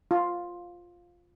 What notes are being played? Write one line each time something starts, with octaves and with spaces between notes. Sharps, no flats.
F4